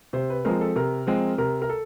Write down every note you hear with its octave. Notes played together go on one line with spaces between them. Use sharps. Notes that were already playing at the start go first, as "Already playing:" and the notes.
C3 C5
B4
F3 G#3 C4 A#4
A4
C3 A#4
F3 G#3 C4
C3 A#4
A#4
A4